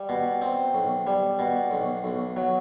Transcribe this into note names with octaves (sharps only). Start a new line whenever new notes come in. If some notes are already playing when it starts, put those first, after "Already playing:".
Already playing: G3
B2
C4
B1
G3
B2
B1
B1
F#3